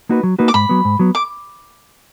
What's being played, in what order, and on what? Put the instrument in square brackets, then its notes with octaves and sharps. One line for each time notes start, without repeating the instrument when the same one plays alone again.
[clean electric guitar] A#3 D#4 F#4 B4
F#3
A#3 D#4 F#4 B4
[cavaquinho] D6
[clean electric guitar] G#2 [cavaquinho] B5
[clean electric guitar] F#3 B3
G#2
F#3 B3
[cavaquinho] D6